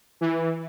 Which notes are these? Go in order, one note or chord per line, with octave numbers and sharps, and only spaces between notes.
E3